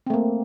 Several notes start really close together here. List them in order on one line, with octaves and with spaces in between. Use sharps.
C4 A3 A#3